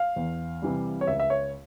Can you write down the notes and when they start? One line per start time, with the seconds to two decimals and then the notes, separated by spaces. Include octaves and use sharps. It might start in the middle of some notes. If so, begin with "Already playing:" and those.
Already playing: F5
0.16 E2
0.62 C3 E3 G3
1.01 C#5
1.07 C#2 E5
1.20 E5
1.30 C#5